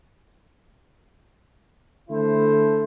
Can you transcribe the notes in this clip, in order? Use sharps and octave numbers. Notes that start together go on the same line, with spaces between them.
D3 A3 E4 C5